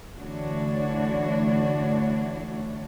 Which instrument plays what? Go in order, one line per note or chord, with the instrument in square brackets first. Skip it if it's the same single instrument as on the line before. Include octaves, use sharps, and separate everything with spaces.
[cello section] D3 E3 A3 D4 F#4 C#5